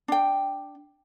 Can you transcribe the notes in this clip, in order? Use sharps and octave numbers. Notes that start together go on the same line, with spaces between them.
D4 G5